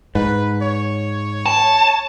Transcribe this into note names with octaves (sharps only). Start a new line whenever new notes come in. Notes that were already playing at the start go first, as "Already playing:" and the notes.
G#2 B4
C#5
A5